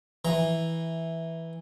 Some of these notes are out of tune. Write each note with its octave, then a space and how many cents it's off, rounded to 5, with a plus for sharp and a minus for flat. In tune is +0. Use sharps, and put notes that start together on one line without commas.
E3 -5 A#5 +0